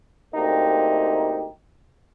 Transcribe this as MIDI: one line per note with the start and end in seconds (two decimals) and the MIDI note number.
0.34 1.47 38
0.34 1.47 58
0.34 1.47 60
0.34 1.47 63
0.34 1.47 67